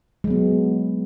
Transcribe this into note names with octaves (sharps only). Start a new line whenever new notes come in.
F#3 G#3 B3